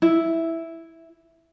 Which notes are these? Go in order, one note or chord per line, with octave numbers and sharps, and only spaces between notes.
E4